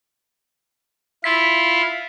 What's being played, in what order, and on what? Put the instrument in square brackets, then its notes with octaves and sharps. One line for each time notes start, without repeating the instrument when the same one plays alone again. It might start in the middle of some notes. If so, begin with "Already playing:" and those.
[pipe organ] E4 F4 [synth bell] B6